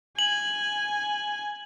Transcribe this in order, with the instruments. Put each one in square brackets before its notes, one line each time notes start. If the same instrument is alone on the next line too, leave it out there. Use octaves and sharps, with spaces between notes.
[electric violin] G#5 [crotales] F#7